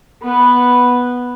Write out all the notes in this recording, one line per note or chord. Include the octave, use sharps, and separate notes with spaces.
B3 B4